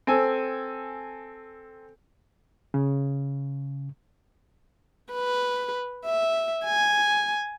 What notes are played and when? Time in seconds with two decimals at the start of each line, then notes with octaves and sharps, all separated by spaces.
0.07 C4 A4 G#5
2.74 C#3
5.13 B4
6.06 E5
6.65 G#5